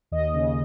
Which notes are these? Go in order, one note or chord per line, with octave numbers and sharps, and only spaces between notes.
D#2 D#5
C#3